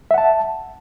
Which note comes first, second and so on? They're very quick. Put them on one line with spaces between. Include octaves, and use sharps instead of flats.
E5 F#5 A5